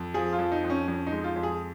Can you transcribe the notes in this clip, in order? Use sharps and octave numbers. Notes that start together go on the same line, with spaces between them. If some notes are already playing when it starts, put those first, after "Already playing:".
Already playing: F2
F3 G#4
F4
F2
D#4
F2
C#4
F2 C#4
D#4
G#3
F4
F2
G#4